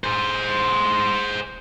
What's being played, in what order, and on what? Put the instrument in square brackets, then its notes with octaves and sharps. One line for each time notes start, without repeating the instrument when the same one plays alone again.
[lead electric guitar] G#4 C5